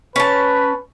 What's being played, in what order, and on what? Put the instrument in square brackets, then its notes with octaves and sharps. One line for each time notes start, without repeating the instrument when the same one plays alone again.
[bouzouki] C#4 A5 [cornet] B4